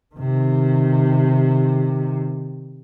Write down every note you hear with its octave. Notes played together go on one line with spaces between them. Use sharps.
C3 D#3